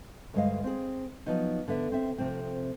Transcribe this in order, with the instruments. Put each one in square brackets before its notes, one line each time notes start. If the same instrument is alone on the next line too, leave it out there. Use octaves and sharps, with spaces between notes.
[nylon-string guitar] D2 G2 G#3 D#5 F5
C4 G#4
F3 F#3 B3 D#4
D3 B3 E5
C4 E5
C3 F3 A3 C4